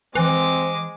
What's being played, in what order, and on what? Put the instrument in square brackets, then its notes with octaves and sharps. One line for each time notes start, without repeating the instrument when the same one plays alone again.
[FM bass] E3 [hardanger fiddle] G#3 D6 [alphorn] C4